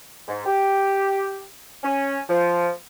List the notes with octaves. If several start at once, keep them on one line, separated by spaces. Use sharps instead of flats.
G#2
G4
C#4
F3